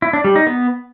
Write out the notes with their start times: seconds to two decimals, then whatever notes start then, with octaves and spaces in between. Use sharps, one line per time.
0.02 E4
0.13 D4
0.24 G3
0.36 D#4
0.47 B3